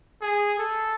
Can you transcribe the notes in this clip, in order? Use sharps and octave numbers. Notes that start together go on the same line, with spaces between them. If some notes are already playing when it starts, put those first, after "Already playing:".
G#4
A4